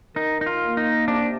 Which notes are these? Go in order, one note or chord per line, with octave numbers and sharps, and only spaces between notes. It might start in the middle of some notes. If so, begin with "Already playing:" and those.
D#3 D#4
D#4
F4
A#3
D#4
C3 D4